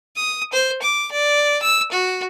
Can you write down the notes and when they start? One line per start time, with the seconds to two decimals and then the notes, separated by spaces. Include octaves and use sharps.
0.16 D#6
0.53 C5
0.82 D6
1.12 D5
1.62 E6
1.92 F#4